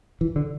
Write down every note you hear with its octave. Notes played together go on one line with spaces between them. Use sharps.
E3
D3